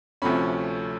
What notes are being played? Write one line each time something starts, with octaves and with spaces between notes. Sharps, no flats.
D2 C3 F3 A3 C#4 B5